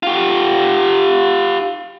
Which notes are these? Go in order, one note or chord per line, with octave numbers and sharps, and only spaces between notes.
F4 G4